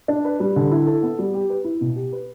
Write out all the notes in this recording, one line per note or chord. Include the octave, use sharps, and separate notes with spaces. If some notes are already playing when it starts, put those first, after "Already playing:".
D4
B4
G3
D3
E4
A4
B3
G3
G4
B4
E4
B2
G4
B4